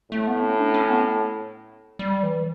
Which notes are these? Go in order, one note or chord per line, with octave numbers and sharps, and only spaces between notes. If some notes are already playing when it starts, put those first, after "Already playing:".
A2 A3
B3
C#4
D4
C#4
B3
G3
E3